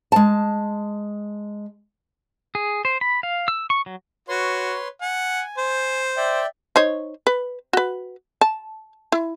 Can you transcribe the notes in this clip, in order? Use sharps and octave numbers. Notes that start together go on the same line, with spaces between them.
G#3 A5
G#4
C5
B5
F5
E6
C#6
F#3
F#4 B4 C#5 C6
F#5 G#5
C5
D5 E5 G5
D#4 C5 C#5
B4
F#4 B4
A5
E4